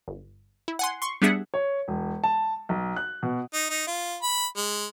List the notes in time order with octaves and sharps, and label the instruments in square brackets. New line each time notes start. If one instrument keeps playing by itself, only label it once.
[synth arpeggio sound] G1
E4
F#5 G#5 C6
C6 C#6
G3 B3 D4 G#4 E5 F#5
[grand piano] C#5
E1
A5
B1
F#6
B2
[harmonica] D#4
D#4
F4
B5
G#3